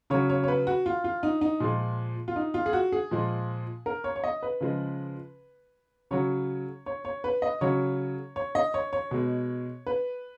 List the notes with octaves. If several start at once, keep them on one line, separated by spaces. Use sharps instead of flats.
C#3 F#3 C#5
C#5
C#5
B4
F#4
F4
F4
D#4
D#4
A#2 F3 G#3
F4
D#4
F4
G#4
F#4
G#4
A#2 F3 G#3
A#4
C#5
C#5
D#5
B4
C#3 F3 G#3
C#3 F#3 C#5
C#5
C#5
B4
D#5
C#3 F#3 C#5
C#5
D#5
C#5
C#5
B2 G#3
B4